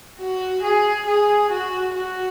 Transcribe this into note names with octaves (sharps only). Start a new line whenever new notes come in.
F#4
G#4
G#4
F#4
F#4